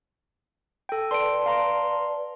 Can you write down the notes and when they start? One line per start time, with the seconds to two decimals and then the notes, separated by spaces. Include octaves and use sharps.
0.89 A4 G5
1.11 B4 D5 A5 C6 D7
1.46 F5 A#5 C6